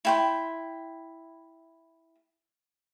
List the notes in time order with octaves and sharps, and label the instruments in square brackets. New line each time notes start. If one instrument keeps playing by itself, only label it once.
[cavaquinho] E4 G5 C6